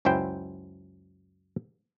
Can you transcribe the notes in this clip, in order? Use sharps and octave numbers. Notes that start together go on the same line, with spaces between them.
C#2 F#2 E4 C5 G5